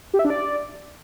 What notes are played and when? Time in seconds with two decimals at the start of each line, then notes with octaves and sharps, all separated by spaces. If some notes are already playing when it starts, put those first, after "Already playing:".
0.14 G4
0.19 E5
0.25 D4
0.30 D5